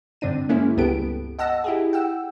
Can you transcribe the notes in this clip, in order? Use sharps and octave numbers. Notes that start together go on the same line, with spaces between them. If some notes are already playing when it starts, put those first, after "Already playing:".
G2 D3 C4 D4 D#7
G#3 A#3 C#4 E4 G#4
C#2 G2 B3 G4 A4 D7
D#5 F#5 A5 E6 A#6
E4 G4 G#4
F#5 G5 E6